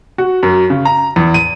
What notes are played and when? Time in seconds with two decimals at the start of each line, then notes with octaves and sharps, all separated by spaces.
0.18 F#4
0.43 F#2
0.70 C#3
0.85 A#5
1.16 E2
1.34 D#7